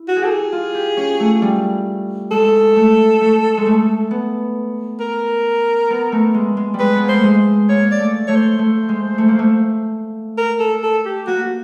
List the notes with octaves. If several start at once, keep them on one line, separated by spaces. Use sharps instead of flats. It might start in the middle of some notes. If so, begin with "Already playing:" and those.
Already playing: E4
F#4
G#4
G4 A4
G#4
F4
G4
C#4
A3
G3
G#3 A4
A3
A3
G#3
A3
B3
A#4
B3
A3
G#3
G#3
G3
G#3 B4
B3
A#3 C5
A3
G#3
A#3 C#5
D5
A3
A3 C#5
C5
A3
G#3
A3
A#3
A3
A#4
A4
A4
G4
A#3 F#4